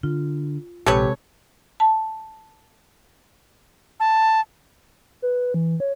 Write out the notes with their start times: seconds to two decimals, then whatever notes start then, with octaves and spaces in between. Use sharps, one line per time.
0.03 D3 F4
0.86 A#1 C3 G#3 C4 G4 A4 B4 C#5
1.80 A5
4.00 A5
5.22 B4
5.54 E3
5.80 C#5